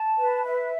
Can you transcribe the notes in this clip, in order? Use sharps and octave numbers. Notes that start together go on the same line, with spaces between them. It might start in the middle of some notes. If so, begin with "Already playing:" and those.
Already playing: A5
B4
E5